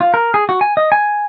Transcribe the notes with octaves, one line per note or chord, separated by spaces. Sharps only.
F4
A#4
G#4
F#4
G#5
D#5
G#5